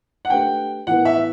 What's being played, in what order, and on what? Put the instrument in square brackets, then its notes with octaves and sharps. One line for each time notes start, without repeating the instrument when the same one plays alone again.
[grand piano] F#5
[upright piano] A3 D4 G4 B4 [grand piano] G5
[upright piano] A2 E3 B3 E4 B4 [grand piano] F#5
[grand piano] E5